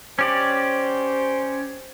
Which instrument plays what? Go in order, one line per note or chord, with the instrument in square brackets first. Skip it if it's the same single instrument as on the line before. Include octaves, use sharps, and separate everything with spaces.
[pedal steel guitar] C#4 G4 D5 [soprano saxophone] C5